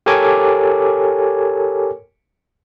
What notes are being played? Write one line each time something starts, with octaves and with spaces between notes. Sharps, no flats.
G4 A4 A#4 C#5 G#5 D6